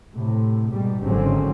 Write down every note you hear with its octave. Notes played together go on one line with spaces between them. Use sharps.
A2 C3
G#2 B2 G3
G#1 G#2 D3 F#3 C4 C#4